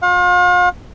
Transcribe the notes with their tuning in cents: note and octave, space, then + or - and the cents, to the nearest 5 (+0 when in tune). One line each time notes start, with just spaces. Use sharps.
F4 +40 F5 +40